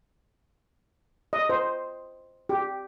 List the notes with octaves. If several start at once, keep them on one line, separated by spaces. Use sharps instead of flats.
D#5
C5
G4